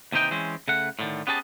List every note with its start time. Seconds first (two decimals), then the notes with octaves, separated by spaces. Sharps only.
0.12 D#2 C3 E3 D#4 G5
0.31 E3 G#3 C4 C#4
0.68 C#3 A3 F#5
0.99 A2 D3 D#3
1.27 B3 C#4 G4 G#4 A5